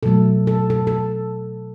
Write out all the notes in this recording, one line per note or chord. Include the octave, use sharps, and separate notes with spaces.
B2 F#3 A3 A4
A4
A4
A4